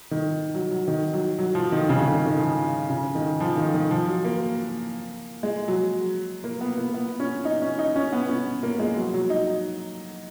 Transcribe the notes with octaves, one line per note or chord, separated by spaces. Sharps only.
D#3
F#3
F#3
D#3
F#3
F#3
F3
D#3
C#3
D#3
C#3
D#3
D#3
F3
C#3
D#3
F3
D#3
D#3
F3
F#3
A#3
G#3
F#3
A#3
B3
A#3
B3
C#4
D#4
C#4
D#4
C#4
B3
C#4
A#3
G#3
F#3
F#3
D#4